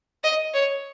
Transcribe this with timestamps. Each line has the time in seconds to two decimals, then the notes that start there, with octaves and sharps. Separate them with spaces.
0.24 D#5
0.54 C#5